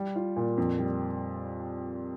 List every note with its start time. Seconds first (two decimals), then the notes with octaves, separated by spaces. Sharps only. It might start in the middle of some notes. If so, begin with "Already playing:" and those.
Already playing: G3
0.15 F4
0.36 A#2
0.57 F2
0.79 G3